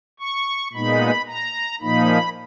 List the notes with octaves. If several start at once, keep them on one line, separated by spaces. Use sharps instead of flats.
C#6
A#2 G#3 B3 D#4 B5
A#5
A#2 F3 A#3 D#4 B5